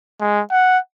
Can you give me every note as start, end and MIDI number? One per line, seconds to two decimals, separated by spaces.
0.21 0.41 56
0.51 0.78 78